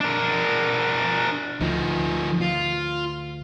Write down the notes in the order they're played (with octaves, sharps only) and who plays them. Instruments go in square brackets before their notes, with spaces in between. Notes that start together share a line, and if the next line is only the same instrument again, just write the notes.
[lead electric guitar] D4 A#4
[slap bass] D2 [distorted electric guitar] F3 D#4
[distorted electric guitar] F4